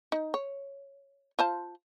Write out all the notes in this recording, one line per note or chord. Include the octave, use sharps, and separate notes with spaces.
D#4
C#5
F4 C5 A5